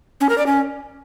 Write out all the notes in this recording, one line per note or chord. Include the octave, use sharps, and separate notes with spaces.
C#4
A#4
D5
C#4